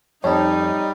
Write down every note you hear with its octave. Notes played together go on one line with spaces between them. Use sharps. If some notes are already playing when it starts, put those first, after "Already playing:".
F2 G3 D#4 C#5 D#5